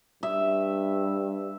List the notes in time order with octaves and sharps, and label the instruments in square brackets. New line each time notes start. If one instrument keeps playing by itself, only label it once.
[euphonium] G2 [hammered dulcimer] E5